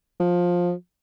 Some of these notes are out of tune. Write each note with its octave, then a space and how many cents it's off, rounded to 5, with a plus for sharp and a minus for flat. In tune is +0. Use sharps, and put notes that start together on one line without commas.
F3 +15